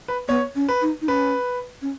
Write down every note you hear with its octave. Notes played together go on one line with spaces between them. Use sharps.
B4
B3 C#5
C#4
B4
D#4
D#4
C#4 B4
C#4